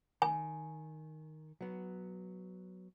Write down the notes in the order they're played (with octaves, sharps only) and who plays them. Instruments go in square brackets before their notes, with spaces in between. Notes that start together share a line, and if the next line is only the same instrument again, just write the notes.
[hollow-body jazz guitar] D#3 [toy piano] G#5
[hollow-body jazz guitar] F#3 B3